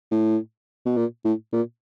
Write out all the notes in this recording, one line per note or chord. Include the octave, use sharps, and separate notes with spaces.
A2
B2
A#2
A2
A#2